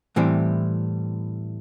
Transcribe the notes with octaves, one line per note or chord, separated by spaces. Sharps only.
A2 E3 G3 C4